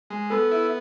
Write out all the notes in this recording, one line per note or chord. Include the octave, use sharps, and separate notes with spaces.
G#3
B3 A4
E4